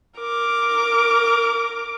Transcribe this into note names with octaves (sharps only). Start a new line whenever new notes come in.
A#4 D6